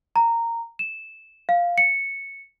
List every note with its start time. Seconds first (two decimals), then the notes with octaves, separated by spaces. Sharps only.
0.16 A#5
0.79 E7
1.49 F5
1.78 C#7